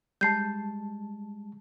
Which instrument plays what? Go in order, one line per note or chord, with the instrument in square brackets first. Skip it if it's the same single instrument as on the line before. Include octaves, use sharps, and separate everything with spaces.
[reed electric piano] G3 G#3 A5 [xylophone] G6 C7